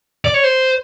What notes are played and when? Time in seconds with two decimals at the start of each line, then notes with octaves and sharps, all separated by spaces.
0.25 D5
0.34 C#5
0.44 C5